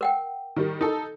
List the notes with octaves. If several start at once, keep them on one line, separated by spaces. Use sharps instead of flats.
A#4 F#5 G5
D#3 G3
D#4 A4